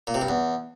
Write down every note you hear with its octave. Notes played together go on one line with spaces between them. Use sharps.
A#2
C3
G2
E2